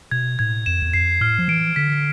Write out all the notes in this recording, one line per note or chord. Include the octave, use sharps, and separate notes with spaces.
B2 G#6
A2 G#6
F2 E7
E2
F2 C7
A2 F6
F3
E3 D7
D3 B6